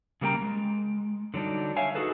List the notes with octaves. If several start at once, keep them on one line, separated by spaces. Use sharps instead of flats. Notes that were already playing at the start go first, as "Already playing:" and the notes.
C#3 G3 A#3 F#4 G5 A#5
G#3
D3 F#3 G3 D4 D#4
C#5 E5 F5 G#5
D#4 F#4 G#4 A4 B4